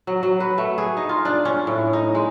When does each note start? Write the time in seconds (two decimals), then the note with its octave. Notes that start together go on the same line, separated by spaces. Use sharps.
0.07 F#3
0.23 F#3
0.40 B4
0.58 A3
0.78 G#4
0.97 D#4
1.09 F4
1.25 D4
1.45 C#4
1.67 A2
1.93 D#4
2.15 G#3